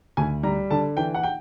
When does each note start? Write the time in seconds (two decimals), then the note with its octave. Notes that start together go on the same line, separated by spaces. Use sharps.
0.17 D2 G#5
0.43 G3 A#5
0.70 D3 A5
0.97 E3 G5
1.14 F#5
1.23 G5